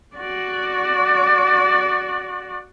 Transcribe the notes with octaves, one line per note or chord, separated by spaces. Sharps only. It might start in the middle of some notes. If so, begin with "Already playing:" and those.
F#4 D5